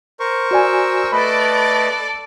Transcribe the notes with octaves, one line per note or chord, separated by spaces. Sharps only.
A#4 C5 C#6
F#4 D5 G#5 E6
A3 A4 B4 D5 D#5 B5